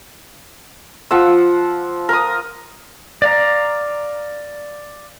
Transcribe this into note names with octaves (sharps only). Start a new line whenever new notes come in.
F3 F#5 E6
A#4 D#6
D5 F5 A#5